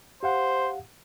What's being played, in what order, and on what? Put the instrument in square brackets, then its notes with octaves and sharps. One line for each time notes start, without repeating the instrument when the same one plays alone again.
[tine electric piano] G4 F5 F#5 [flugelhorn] C5